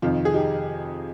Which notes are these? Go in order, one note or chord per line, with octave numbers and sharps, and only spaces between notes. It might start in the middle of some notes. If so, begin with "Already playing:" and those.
F2 C3 D#3 F4
G#4
D#4 G4